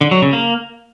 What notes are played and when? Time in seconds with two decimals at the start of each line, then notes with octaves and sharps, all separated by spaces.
0.01 D3
0.11 F#3
0.22 C#3
0.33 A#3